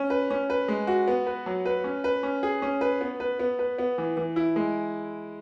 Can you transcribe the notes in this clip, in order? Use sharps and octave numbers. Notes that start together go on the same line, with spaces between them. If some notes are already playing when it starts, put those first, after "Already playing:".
Already playing: C#4
B4
C#4
B4
G#3
F#4
B3
B4
F#3
B4
C#4
B4
C#4
G#4
C#4
B4
B3
B4
B3
B4
B3
E3
E3
E4
G#3